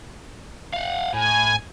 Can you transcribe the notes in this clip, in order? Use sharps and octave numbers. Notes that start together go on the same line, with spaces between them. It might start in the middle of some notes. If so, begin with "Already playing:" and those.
F5 F#5
A2 G#5